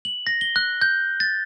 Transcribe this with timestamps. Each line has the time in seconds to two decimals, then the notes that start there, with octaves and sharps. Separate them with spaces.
0.05 F#7
0.27 A#6
0.41 G7
0.56 F#6
0.82 G6
1.20 A6